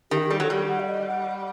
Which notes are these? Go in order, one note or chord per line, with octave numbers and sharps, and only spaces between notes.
D#3 G4
G4
G3 A4
F#3
G3 G4
F#5
D5
D#5
F#5